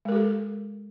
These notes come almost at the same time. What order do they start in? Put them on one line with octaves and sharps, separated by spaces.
G#3 A#4 G4 A4